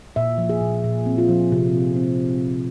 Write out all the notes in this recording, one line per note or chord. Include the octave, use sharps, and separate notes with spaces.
A#2 E5
F3
G#4
A#2
A#2
C4
F4
F3
C3
C3
C4